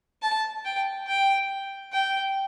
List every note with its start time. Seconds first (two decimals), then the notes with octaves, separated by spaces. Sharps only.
0.22 A5
0.65 G5
1.07 G5
1.93 G5